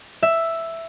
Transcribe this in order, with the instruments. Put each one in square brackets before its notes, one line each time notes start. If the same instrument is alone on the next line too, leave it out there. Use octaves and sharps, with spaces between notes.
[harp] E5